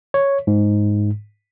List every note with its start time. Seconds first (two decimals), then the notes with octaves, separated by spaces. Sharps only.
0.14 C#5
0.47 G#2